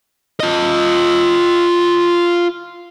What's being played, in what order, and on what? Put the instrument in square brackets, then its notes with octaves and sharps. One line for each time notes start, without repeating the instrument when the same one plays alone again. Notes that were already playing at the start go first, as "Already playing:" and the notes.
[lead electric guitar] F4 D#5